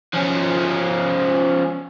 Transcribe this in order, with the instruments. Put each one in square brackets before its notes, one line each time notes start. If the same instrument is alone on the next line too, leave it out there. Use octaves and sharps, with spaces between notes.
[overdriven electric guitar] F3 C#4